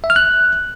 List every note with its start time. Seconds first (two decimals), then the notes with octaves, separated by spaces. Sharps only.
0.04 E5
0.10 F6
0.16 F#6